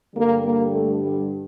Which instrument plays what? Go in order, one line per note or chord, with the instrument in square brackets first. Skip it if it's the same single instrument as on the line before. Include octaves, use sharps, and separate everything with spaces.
[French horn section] G2 D3 G3 A#3
A#3
A3
G3